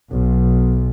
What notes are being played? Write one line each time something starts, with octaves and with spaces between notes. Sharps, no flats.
B1